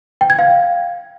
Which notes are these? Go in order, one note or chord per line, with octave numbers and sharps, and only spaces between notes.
G5
G#6
F5